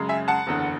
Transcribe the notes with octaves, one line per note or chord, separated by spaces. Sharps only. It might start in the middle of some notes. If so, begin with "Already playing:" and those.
Already playing: F#2 C#3 G#3
E5 G#5
F#5 A5
F#1 E2 D3